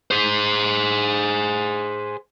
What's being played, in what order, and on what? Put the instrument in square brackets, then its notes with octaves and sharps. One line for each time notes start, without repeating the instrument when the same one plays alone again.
[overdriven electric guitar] G#4 C5